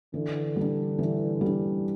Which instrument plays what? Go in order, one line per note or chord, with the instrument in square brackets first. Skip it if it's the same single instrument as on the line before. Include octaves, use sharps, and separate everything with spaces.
[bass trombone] D3 [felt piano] E3
[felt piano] G3 D4
E3
G3 D4